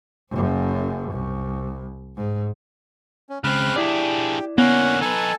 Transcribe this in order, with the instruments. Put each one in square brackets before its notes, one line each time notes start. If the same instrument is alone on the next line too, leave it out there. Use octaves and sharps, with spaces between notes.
[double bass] F#1 F#2
C2
G#2
[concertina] C#4
[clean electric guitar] C#2 [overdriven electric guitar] C#3 C4 [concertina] B5 F6 F#6
[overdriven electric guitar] D4 G#4 [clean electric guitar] E4 D5 [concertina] G4
[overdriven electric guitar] D3 A#3 [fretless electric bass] B3 [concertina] C#4 F#5
[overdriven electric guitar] D#4 B4 [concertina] A4 G#5 A5